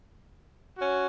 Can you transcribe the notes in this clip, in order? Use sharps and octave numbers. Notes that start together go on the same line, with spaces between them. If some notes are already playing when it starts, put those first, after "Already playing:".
C#4 F#4